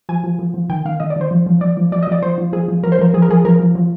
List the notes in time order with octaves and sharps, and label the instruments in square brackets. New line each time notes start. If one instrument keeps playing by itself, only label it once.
[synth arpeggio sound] F3 G#5
F3
F3
F3
D#3 G5
D#3 F5
D#3 D#5
D5
D#3 C5
F3
F3
F3 D5
F3
F3 D5
D#5
F3 D5
F3 C5
F3
F3 G#4
F3
F3 A#4
C5
F3 A#4
F3 G#4
A#4
F3 G#4
F3 A#4
F3
F3